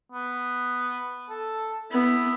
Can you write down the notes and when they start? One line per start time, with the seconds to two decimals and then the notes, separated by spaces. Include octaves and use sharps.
0.12 B3
1.30 A4
1.91 B3 E4